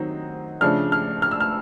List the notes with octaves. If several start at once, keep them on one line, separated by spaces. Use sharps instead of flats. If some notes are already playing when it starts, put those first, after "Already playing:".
Already playing: D#3 F#3 C4 D#4
C#3 F3 A3 D4 F6
F6
F6
E6
F6